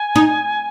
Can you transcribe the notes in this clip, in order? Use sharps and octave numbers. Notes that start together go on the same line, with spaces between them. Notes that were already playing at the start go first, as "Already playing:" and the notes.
Already playing: G#5
D#4